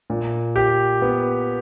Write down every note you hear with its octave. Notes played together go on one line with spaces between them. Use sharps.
A#2
G4
B3